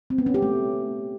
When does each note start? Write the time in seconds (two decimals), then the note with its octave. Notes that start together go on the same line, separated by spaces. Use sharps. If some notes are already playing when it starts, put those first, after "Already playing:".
0.10 C4
0.18 B3
0.26 C#4
0.34 G4
0.42 A3